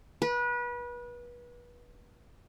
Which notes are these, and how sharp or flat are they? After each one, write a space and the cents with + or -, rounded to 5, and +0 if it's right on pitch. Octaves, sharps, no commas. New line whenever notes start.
B4 -30